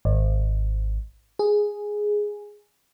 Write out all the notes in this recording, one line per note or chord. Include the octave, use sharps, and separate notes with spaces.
G#1
G#4